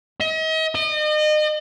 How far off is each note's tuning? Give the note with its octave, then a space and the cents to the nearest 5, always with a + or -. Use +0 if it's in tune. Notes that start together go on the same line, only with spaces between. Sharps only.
D#5 +40
D#5 -35